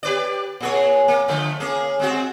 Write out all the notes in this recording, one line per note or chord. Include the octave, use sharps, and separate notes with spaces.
G4 B4 D5
A#2 G#4 C#5
A#3
D3 F3 A3
A#3 C#4 G#4
G#3 C4 F#4